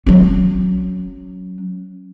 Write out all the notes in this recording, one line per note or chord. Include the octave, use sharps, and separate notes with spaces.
F#3 C#4